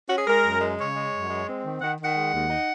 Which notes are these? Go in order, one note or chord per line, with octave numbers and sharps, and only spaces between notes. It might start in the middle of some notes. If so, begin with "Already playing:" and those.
C#4 F#4
G#4
G#3 A#4
F#2
G#3
C#3 C#5
G#3
F#2
G#3
C4
D#3
D#3 F#5
D#3 F#5
G#3
D#2
D#4